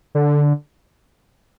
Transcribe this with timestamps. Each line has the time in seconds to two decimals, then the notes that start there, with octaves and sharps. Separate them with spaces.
0.15 D3